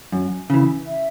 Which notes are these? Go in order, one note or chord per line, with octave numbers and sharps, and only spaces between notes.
F#2
C#3 E3
E5